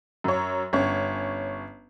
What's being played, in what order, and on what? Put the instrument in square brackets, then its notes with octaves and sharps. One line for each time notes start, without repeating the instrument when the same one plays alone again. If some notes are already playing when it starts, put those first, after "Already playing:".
[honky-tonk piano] F#2 C#5
G1 C#4 C#5